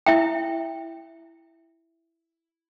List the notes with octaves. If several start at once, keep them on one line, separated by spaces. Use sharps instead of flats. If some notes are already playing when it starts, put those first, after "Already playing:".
E4 E5 G5